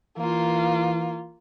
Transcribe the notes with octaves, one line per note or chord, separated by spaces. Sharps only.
E3 A#3 F4